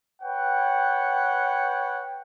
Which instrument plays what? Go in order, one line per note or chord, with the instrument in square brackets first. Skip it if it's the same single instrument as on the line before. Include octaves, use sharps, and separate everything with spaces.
[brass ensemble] B4 C#5 F#5 G5